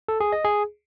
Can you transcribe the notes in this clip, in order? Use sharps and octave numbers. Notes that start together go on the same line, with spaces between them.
A4
G#4
D#5
G#4